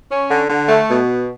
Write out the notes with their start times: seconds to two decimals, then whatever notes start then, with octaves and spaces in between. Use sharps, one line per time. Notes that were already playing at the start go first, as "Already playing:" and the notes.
0.10 C#4
0.29 D3
0.49 D3
0.68 A3
0.88 B2